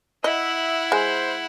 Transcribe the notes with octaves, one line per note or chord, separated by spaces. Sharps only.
E4 D#5 E5 F#5
G#3 C5